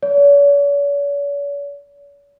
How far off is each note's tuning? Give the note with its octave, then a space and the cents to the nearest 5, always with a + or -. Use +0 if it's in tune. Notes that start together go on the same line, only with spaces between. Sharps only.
C#5 +45